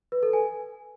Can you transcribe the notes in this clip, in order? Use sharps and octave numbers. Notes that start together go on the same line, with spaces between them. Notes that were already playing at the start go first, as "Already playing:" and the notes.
B4
A4
G#5